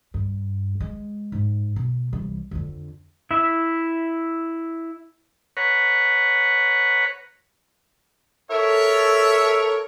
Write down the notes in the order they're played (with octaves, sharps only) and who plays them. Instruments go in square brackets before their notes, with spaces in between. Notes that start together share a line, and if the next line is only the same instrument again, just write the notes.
[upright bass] G2
G#3
G#2
B2
C2 E3
F2 D3
[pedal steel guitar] E4 E5
[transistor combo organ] B4 C#5 F#5 A#5
[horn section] A4 A#4 C#5 [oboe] E5